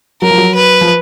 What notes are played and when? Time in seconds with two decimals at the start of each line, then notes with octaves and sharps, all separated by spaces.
0.22 F#3 A#4
0.30 F3
0.38 F#3
0.55 B4
0.81 F3